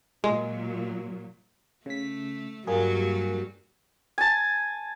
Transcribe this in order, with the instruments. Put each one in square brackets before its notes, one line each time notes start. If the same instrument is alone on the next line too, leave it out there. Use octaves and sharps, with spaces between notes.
[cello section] A#2 F#3 [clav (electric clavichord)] G#3
[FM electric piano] C#3 B6 [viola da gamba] A3
[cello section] G2 [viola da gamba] F#3 [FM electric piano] G3 A#3 G#4
[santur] G#5 A5